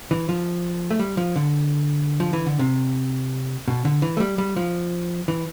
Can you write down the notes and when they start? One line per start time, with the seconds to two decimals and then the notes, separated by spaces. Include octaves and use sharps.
0.11 E3
0.29 F3
0.91 A3
0.99 G3
1.17 F3
1.36 D3
2.20 F3
2.33 E3
2.46 D3
2.59 C3
3.68 B2
3.85 D3
4.02 E3
4.17 A3
4.20 G3
4.38 G3
4.56 F3
5.28 E3